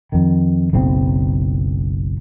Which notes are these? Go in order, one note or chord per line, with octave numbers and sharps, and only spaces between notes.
F2 D#3
F#1 B1 C4